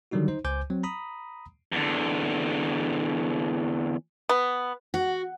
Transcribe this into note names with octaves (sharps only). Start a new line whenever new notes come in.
D3 D#3 F#3 G3 D#4 F#4
D#4 C5
C#2 C5 G#5 D6 G6
F#3 C4
A#5 B5 D#6
E2 D3
B3
F#4